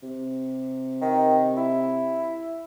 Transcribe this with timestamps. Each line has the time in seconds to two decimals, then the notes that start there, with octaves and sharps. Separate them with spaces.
0.03 C3
1.02 D#3
1.57 E4